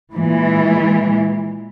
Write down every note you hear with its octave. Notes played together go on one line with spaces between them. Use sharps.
A#2 E3 G#3